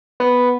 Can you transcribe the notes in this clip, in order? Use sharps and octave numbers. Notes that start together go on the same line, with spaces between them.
B3